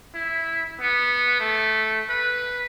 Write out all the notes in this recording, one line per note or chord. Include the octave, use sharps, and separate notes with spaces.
E4
B3
A3
B4